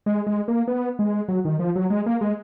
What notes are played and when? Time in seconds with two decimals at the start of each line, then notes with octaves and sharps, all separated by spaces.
0.06 G#3
0.27 G#3
0.48 A#3
0.67 B3
0.99 G#3
1.28 F#3
1.45 D#3
1.59 F3
1.76 F#3
1.90 G#3
2.06 A#3
2.21 G#3